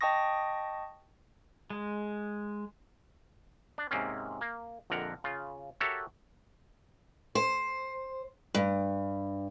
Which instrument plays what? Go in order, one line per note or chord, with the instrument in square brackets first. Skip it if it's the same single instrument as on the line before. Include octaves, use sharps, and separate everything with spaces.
[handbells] D#5 G5 A5 C#6 D#6 A#6
[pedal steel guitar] G#3
[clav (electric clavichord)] D4
G#2 C3 G#3 A#3 C4 C#4
A#3
A#1 F2 D3 A#4 F#5 A#5
C#3 F4
F#4 G4 A4 A#4 C#5 E5
[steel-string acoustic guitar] C5
G2